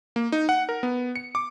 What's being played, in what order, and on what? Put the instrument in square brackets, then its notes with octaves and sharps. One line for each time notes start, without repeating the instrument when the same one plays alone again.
[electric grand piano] A#3
D#4
F#5
A#4
B3
C#7
D6